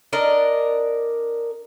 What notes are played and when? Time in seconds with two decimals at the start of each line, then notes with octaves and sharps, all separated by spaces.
0.13 D4 A#4 D5 D#5